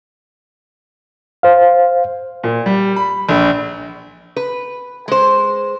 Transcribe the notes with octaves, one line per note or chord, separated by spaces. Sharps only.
C5 F5
A#2
G3
B5
A#1
B4
G#3 C5